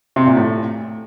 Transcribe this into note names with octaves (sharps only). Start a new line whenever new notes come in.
C3
A#2
A2